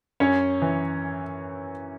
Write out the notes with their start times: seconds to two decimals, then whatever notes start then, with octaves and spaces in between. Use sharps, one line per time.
0.20 F#2 C#4 C#5
0.62 E3